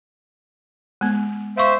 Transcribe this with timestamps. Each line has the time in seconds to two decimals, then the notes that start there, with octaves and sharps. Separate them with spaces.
1.01 G#3 B3
1.57 C5 E5 F5 C#6